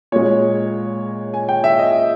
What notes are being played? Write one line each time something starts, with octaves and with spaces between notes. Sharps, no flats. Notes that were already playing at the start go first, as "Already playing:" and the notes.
A#2 G#3 C#5
G#5
G5
E5
D#5